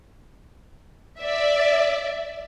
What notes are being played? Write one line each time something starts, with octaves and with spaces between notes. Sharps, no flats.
D5 E5